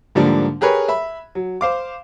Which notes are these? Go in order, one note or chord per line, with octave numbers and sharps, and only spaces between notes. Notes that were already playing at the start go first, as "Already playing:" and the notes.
G#2 D3 F3 G3 A#3 D4
G4 G#4 A#4 B4 C#5
E5 B5
F#3
C5 F5 D6